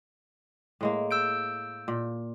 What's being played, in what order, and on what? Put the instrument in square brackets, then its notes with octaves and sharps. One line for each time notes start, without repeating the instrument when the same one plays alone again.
[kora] A2 G#3 A#3
[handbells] E6 G6 D7
[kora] A#2